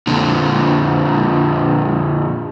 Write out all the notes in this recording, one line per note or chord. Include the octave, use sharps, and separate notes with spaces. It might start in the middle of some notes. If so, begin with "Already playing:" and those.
F2 A#2 D3